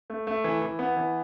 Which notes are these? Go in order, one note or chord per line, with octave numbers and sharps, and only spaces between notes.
A3
A3
E3
E3
B3
E3